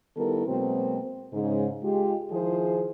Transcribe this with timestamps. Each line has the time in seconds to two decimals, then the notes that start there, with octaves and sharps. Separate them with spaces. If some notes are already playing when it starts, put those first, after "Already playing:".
0.17 D#3 G3 B3 E4 A4 A#4
0.47 B2 F#3 G#3 A#3 C4
1.33 G#2 C#3
1.84 G#3 F4 G4
2.31 D#3 F3 E4 F4 G#4 C5